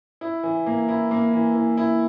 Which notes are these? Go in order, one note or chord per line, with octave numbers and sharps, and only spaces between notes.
E4
E3
A#3
E4
A#3
E3
E3
E4